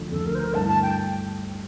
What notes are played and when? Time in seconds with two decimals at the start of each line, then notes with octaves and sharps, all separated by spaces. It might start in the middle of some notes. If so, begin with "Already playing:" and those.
Already playing: D2 D3 F3
0.11 D2 D3 F3 A4
0.26 A#4
0.35 C5
0.39 A#4
0.54 G2 D3 A3 E4 A5
0.68 A5
0.82 G5